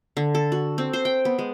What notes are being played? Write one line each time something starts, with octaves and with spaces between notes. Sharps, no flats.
D3
A4
F#4
C4
C5
G5
B3
G#3